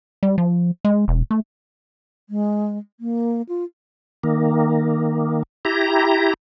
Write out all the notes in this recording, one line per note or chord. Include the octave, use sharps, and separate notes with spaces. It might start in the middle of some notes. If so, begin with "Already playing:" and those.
G3
F3
G#3
E1
A3
G#3
A#3
F4
D#3 A#3
E4 G4 A#5